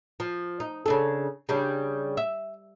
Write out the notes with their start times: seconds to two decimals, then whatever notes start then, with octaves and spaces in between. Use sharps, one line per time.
0.20 F3
0.60 D#4
0.86 C#3 D4 A4
1.49 C#3 G3 D4
2.17 E5